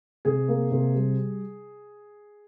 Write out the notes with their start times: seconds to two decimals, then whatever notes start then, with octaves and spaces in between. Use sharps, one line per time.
0.25 C3 G#4
0.48 A#3
0.71 C3
0.95 G3